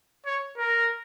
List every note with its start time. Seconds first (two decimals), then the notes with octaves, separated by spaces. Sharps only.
0.26 C#5
0.57 A#4